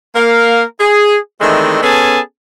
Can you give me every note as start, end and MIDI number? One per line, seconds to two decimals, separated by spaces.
0.16 0.63 58
0.16 0.63 70
0.16 0.63 77
0.80 1.17 68
1.41 1.83 51
1.41 1.83 52
1.41 1.83 56
1.41 1.83 57
1.41 1.83 60
1.41 1.83 62
1.83 2.20 59
1.83 2.20 61
1.83 2.20 68
1.83 2.20 69
1.83 2.20 80
1.83 2.20 81